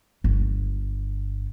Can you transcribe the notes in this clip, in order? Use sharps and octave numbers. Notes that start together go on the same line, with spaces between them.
G1